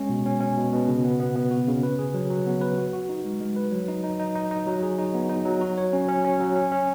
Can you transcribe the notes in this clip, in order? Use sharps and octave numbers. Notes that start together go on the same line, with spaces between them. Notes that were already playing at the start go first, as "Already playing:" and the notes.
Already playing: G#3 C#4
B2
C#4
C#4
B2
B2
C#3
B3
B3
B3
F#4
C#3
B4
G#4
F#3
F#3
B3
B4
F#4
F#4
D#4
G#3
G#3
B4
F#3
D#4
D#4
D#4
D#4
D#4
F#3
G#4
D#4
B3
D#4
F#3
F#4
C#5
C#4
C#4
C#4
F#3
C#4
C#4